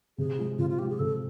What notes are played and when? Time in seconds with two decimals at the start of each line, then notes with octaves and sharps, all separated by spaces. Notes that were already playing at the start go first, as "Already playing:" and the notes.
0.18 C3 G#4
0.38 F3 G#3
0.58 C3 F4
0.69 F4
0.78 F3 G#3 G4
0.89 G#4
0.99 C3 A4